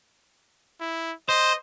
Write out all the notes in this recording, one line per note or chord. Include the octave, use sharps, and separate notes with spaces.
E4
C5 D#5